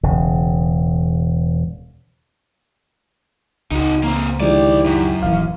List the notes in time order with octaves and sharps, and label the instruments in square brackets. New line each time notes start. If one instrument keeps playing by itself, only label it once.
[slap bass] E1 C#3
[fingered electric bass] C#2 [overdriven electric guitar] D#4 F#4
[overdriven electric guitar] A#3 C4
[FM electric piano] D3 F3 G#3 [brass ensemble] D#3 E4 G4 [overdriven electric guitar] C5 D5
[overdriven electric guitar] F#2
[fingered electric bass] D#1 D#2 E3 [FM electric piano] F5